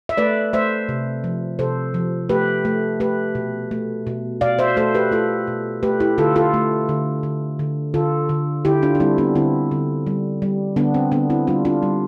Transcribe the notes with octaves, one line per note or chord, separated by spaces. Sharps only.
E5
A3 B4 D5
A3 C5 E5
C3
F3
C3 A4 C5
F3
A3 G4 B4
A3
A3 G4 B4
B2
A3
B2
B2 D5 F5
C5 E5
A3 A4 C5
G4 B4
A3 F4 A4
B2
A3 G4 B4
E4 G4
D3 F4 A4
F4 A4
A3
D3
D3
D3
D3 F4 A4
D3
D3 E4 G4
D4 F4
D4
G3 C4 E4
B3 D4
D3 C4 E4
D3
G3
G3
D3 B3 D4
C4
D3 B3 D4
C4 E4
G3 D4 F4
D4 F4
G3